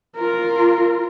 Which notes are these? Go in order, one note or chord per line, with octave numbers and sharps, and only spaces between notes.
F4 A#4